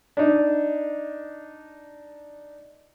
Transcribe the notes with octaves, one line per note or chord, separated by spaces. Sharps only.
D4 D#4